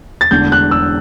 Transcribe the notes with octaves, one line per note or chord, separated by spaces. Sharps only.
A6
E1 E2 D3 A3 G6
F#6
E6